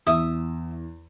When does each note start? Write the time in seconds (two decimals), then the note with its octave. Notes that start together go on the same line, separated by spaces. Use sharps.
0.07 E2 E5 D#6